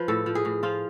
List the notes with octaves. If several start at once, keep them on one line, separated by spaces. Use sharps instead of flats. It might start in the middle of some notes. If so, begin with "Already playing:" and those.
Already playing: F3 B4
A2 A4
F3
G#4
A2
F3 F4